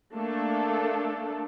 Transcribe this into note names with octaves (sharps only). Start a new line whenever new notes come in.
A3 A#3 D4 A4